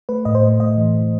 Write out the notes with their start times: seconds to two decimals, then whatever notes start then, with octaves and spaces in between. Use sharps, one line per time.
0.09 A3 B4
0.25 A2 D#5
0.35 C5
0.43 A3
0.60 A2 D#5
0.77 E3
0.95 E3